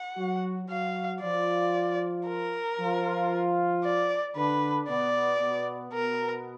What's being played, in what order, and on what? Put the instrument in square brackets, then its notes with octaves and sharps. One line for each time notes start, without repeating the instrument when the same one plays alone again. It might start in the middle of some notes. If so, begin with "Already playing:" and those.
Already playing: [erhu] F#5
[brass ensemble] F#3 F#4
[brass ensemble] F#3 F#4 [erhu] F5
[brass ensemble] F3 F4 [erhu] D5
[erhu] A#4
[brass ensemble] F3 F4
[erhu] D5
[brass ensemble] D3 D4 [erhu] B4
[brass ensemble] B2 B3 [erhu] D5
[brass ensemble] B2 B3
[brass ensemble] B2 B3 [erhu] A#4